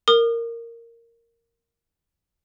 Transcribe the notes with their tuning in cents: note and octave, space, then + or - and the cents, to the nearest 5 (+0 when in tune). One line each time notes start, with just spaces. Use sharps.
A#4 -10 D#6 -40